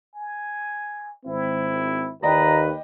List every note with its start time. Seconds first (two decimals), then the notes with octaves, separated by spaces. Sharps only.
0.15 G#5
1.26 G#1 C4 E4
2.23 D#2 B4 D5 D#5 G5 A#5